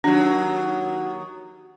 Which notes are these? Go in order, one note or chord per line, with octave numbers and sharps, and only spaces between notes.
D#2 F#3 D4 F#4 F#5